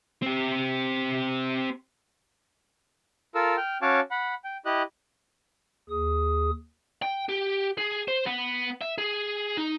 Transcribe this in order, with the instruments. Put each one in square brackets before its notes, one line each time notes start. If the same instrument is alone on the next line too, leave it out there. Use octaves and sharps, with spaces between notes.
[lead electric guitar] C4 G4
[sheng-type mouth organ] F4 A4 A#4 E6
G5 F6
C#4 F#4 C#5 F5 A5 D6
F#5 B5
G5
E4 G4 D#5 F#6
[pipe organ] D#2 G#4 D#6
[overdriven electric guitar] G5
G4
G#4
C5
B3
E5
G#4
D#4